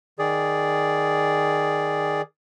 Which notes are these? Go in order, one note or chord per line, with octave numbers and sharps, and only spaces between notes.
D#3 G#4 D5